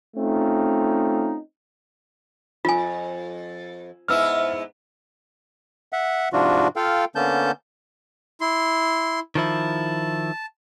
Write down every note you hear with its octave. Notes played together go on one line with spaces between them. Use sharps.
A3 C4 C#4 D#4 F4
F2 F4 G#5
G#2 B3 E4 E5 E6 F6
E5 F#5
G#2 C3 F3 D4 F4 F#4
F4 A4 F5 G5
D3 A#3 B3 C#4 A5 G6
E4 C6
D#3 F3 E4 A5